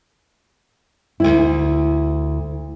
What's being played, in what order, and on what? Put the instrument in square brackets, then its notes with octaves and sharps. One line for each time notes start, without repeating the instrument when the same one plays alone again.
[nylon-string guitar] D2 G2 E4